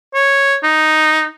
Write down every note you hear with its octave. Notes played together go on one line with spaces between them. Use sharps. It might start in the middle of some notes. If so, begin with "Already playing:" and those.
C#5
D#4